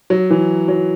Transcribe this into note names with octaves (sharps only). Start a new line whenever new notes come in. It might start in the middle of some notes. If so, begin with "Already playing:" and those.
F#3
E3
F#3